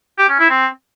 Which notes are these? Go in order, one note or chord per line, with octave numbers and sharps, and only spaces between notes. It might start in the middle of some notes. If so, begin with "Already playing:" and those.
G4
C#4
E4
C4